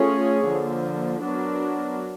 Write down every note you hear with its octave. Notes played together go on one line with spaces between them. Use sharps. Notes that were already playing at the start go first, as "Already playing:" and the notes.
Already playing: A3 C#4 F4 G#4 C#5
D3 F3 A#3
F#3 B3 D4 F#4 A#4